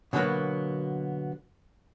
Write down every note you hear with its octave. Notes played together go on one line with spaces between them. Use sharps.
B2 D3 F#3 A#3 B3